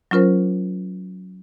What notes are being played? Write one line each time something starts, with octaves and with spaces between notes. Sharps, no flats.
F#3 C#4 F4 A#4 C5